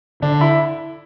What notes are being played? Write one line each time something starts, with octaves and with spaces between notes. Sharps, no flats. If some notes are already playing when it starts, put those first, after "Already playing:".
D3 D4
E4